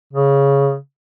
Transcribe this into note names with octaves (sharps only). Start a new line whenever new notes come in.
C#3